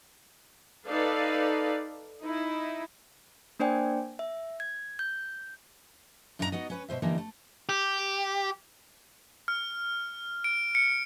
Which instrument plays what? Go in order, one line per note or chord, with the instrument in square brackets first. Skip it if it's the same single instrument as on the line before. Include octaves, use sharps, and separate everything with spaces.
[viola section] D#4 A4 B4 D5 F5
D#4 E4
[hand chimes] A#3 D4 C5 D5 G5 G#5
E5
G#6
G6
[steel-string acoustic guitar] F#2 A#2 D4 D#4 A4 A#5
B3 D#4 F#4 D#5
C#4 B4 C#5
B2 E3 C5 E5
D3 E3 G3 A#3 D#4
A3
[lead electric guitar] G4
[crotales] F6
D7
C#7